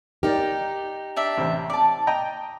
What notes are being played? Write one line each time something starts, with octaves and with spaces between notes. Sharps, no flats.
D#4 G4 A#4 D5
D4 D5 E5
A1 C3 C5
D5 A5 D6
D#5 G5 A#5